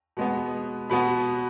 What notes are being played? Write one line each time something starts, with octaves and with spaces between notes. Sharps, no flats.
B2 G#3 B3
B2 B3 B5